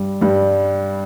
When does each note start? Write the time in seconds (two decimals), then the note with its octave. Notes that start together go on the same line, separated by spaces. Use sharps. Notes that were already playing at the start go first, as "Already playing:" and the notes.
Already playing: G2 G3
0.21 G2 G3